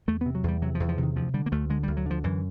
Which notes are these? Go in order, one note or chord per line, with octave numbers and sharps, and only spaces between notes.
E2 A3
C3 B3
F#3
E2 G3
C3 F#3
F3
E2
F3
C3
D#3
D2 F3
D3 G3
A#3
D2 A3
D3 G#3
D2 G3
F#3
D3 F3
F#2 E3